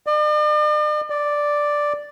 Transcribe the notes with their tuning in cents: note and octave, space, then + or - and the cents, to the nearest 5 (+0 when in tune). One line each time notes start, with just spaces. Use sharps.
D5 +45
D5 +0